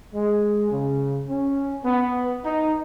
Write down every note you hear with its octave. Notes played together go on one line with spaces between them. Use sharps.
G#3
C#3
C#4
B3
D#4